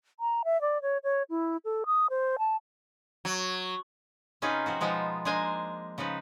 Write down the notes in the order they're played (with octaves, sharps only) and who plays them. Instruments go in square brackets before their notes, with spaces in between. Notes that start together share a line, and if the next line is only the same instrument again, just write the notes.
[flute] A#5
E5
D5
C#5
C#5
E4
A4
D#6
C5
A5
[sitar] F#3
[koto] C3 C#4 D#4 F4 G#4 B4
F3 C4 F#4
B2 F3 G#3 B3 D#4 F4
G#3 A#3 D4 C5 G#5 A#5
C#3 F3 D#4 B4